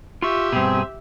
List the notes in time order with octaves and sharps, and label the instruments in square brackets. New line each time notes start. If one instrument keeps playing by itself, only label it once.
[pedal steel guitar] F4 C#6 [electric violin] G4 E5
[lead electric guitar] G2 B2 [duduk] C4 [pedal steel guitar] G#4